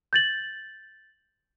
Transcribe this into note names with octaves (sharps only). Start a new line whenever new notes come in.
G6 A6 F#7